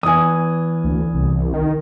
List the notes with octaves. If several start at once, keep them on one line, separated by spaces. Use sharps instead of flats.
E2 E3 G#5 D#6
D2
C2
D#3